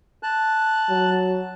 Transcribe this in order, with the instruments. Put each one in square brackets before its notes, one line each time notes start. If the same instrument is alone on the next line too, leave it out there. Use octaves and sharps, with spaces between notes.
[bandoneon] A5 F#6
[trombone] F#3